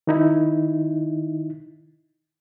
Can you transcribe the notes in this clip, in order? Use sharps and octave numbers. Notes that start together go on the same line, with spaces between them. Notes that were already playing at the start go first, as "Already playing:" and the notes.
D#3 D#4 E4